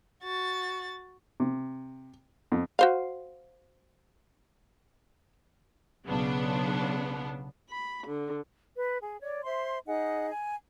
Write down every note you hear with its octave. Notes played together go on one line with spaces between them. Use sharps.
F#4 A6
C3
F2
F#4 C5 F5
B1 C#3 B3 D4
B5
D3
B4
G#4
C#5 D5
C5 E5 C6
D#4 G#4 D#5 F#5
G#5